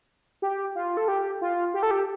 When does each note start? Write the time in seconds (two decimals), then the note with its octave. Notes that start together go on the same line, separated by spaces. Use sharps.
0.42 G4
0.75 F4
0.97 A4
1.08 G4
1.41 F4
1.74 G4
1.83 A4
1.91 G4